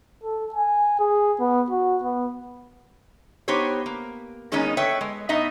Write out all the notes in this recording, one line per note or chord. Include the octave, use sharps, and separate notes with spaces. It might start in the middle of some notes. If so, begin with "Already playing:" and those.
A4
G#5
G#4
B3
F#4
B3
B3 D#4 G4 C5 C#5
A#3
D#3 G#3 A#3 B3 C#4 D#4
A4 B4 C#5 E5 G5
G#3
A2 B3 D#4 D#5 E5